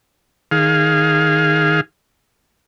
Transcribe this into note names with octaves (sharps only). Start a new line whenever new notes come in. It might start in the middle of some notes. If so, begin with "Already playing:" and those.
D#3 G#4 F5